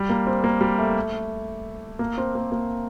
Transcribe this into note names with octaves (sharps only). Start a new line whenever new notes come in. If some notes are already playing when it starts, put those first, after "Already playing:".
Already playing: G3
A#3
C4
A#3
G3
A3
A#3
C4
A#3
A#3